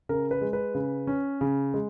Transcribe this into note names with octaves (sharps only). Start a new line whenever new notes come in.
C#3 A#4
B4
G#3
B4
C#3
C#4
C#3
G#3